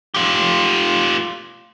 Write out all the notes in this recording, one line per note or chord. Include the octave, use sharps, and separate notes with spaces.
F4 G4